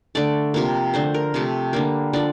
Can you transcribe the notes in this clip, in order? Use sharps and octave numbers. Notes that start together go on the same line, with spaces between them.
D3 A3 D5
C3 F3 A#3
D3 A3 C5
A#4
C3 F3 A3
D3 G3 A#3
D3 F3 D5